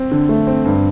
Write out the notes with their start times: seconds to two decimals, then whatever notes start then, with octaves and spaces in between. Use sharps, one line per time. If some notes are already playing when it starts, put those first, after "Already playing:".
Already playing: C4
0.11 D3
0.29 A3
0.47 C4
0.65 G2